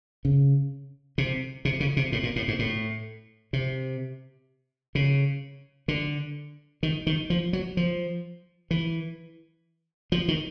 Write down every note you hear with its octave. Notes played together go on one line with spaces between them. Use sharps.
C#3
C3
C3
C#3
C3
A2
A#2
A2
G#2
A2
C3
C#3
D3
D#3
D#3
F3
F#3
F3
E3
F3
D#3